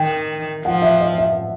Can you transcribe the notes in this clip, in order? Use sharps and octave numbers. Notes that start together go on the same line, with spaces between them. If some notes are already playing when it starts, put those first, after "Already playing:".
Already playing: D#3 G5
F3 F#5
E5
D#5
E5